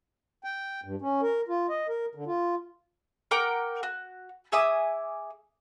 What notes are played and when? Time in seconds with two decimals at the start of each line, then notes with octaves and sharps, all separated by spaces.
0.44 G5
0.84 G2
1.01 C#4
1.22 A#4
1.48 F4
1.69 D#5
1.88 A#4
2.15 D3
2.27 F4
3.31 A#4 F#5 G5 D6
3.83 F#4
4.52 G#4 E5 D6 D#6